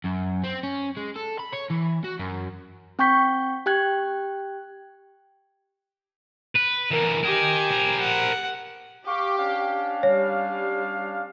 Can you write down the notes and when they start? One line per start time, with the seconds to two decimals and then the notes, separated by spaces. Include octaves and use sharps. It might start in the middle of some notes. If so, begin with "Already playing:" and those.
0.05 F#2
0.44 C4
0.63 C#4
0.97 G#3
1.16 A4
1.39 B5
1.53 C#5
1.70 E3
2.04 F#4
2.19 F#2
2.99 C4 G5 C#6 G6 B6
3.66 G4 G5 F#6 G#6
6.55 B4
6.91 D3 E3 A#4
7.24 G4 A#4 D#5 G#5
7.72 A#4 C5
8.01 F#5
9.06 G4 F5 C#6 D6
9.37 C#4 D4 F5
10.03 G3 C#5